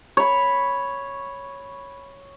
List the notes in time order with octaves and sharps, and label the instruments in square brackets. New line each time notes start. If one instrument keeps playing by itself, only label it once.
[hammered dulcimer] C#5 B5